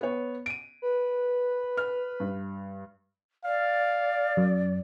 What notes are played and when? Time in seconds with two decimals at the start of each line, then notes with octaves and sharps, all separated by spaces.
0.01 B3 C#5
0.46 D7 D#7
0.82 B4
1.77 F6
2.20 G2
3.45 D5 F5
4.37 F#2